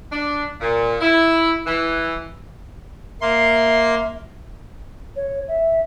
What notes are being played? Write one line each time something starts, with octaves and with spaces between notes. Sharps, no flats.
D4
A#2
E4
E3
A#3 E5 C6
C#5
E5